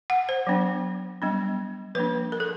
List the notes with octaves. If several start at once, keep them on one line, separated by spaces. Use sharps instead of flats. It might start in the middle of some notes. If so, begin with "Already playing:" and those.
F#5
C5
F#3 B3 D4
G3 B3 D4
F3 A#3 D4 B4
A#4
A4